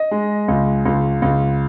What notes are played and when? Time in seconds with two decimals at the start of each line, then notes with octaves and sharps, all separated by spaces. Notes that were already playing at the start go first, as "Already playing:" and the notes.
Already playing: D#5
0.11 G#3
0.48 C#2
0.85 C#2
1.22 C#2